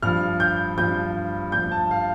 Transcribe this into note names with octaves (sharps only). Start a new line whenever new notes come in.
G2 F3 F6
G6
G2 F3 G6
G2 F3 G6
A5
F5